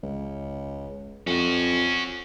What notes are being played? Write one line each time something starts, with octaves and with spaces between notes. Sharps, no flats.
C#2
F2 C#4 F#4